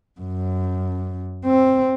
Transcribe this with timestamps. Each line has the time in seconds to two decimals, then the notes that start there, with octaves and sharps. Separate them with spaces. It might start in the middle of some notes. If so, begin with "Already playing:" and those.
0.20 F#2
1.46 C4